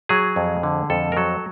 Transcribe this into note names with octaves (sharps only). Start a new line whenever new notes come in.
F#3 G#4
F2
D3
F2 A4
A#4
F#3 A4